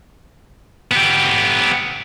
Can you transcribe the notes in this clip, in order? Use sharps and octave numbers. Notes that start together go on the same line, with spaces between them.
B3 G4